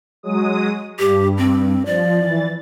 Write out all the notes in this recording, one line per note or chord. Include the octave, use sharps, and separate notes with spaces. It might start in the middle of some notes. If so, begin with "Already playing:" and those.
F#3 G#3 D#6
G2 G4
C4
F3 D5
E3 A6